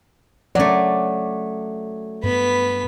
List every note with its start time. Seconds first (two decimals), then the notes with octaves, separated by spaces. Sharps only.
0.55 F#3 A3 C#4 D5
2.24 G2 B3 B5